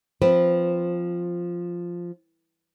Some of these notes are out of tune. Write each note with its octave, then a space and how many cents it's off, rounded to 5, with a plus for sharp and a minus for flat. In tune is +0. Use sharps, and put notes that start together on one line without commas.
F3 +0 C4 +0 B4 +0